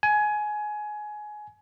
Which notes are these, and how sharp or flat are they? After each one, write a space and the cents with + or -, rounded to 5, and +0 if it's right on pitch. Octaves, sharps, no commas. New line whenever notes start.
G#5 +20